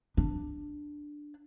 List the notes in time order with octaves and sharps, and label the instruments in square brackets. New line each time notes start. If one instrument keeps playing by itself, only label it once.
[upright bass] D4